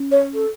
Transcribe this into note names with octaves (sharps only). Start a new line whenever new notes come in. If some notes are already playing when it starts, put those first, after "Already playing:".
Already playing: C#4
C#5
A4